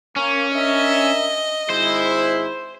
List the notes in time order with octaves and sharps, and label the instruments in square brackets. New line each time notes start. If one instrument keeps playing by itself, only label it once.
[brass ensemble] A#3 [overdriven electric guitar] C#4
[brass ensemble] D4 A#4 E5 [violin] D#5
[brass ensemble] G#1 G#3 E4 [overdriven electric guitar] C5